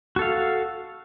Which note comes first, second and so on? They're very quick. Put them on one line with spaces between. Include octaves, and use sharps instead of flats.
F#4 A4 F5